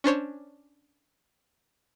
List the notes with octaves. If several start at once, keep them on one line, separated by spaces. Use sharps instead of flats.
C#4 D4 C5 C#5